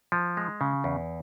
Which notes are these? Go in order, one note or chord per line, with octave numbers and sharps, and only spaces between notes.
F3
G#3
C#3
E2